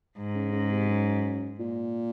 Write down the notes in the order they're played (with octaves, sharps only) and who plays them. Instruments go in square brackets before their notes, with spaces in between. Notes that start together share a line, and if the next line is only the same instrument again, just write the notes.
[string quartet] G#2
[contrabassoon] C#3
C#3
C3
F#2
A#2